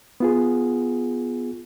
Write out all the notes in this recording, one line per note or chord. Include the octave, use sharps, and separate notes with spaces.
B3 F4 G#4